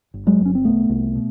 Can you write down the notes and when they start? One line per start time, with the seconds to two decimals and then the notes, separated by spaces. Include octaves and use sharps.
0.14 G1
0.27 F#3 G#3
0.40 G1
0.45 C#4
0.55 C4
0.64 C2 A3 B3
0.89 C2
1.15 B2